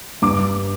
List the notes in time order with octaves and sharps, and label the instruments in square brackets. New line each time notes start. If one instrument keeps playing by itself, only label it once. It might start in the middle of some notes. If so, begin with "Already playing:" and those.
[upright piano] G2 D6